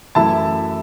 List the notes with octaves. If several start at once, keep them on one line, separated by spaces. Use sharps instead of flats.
F#2 E3 A3 E4 E5 A5